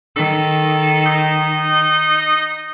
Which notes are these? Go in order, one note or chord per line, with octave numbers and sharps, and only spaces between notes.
D#3 A4
D#4